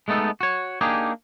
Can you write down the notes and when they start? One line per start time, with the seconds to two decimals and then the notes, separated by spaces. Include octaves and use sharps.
0.08 G#3 A3 B3 D#4 A4
0.41 F#4 C#5
0.81 A#3 D4 D#4 G4 G#4